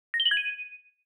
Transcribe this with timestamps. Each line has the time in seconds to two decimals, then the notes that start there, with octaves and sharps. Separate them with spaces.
0.14 A#6
0.20 G7
0.25 F#7
0.31 G#6
0.37 D#7